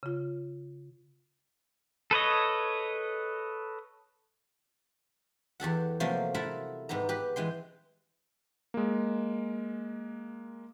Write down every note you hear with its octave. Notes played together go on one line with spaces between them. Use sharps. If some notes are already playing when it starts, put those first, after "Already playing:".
C#3 F4
A4 B4 C#5 D#5
E2 G4 A4 F#5
C3 F3 F#3 A3 A#3
E4 F4 A4 A#4 E5 F#5
G#2 B3 G4 A#5
G4 B4
E3 G#3 G5 C6
G#3 A#3